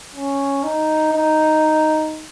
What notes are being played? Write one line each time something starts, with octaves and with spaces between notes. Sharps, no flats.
C#4
D#4
D#4